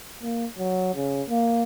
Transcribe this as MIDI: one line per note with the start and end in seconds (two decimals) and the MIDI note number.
0.23 0.46 58
0.58 0.91 54
0.95 1.22 49
1.29 1.63 58